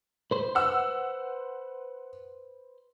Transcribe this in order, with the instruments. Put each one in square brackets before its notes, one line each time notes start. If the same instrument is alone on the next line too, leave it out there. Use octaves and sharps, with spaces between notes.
[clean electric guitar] B4 C5
[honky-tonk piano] F#5 E6